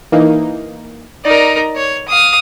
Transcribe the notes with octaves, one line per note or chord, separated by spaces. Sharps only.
E3 A#3 D#4
D#4 A#4 D5
C#5
F5 D#6